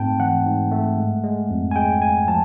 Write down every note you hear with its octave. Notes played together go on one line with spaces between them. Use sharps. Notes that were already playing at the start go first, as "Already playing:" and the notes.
Already playing: G#2 A3 C4 G5 A5
E3 F#5
G#2
A3
G#3
G#3
F2
G#5
G#3 G5
G#3 G#5
F3 A5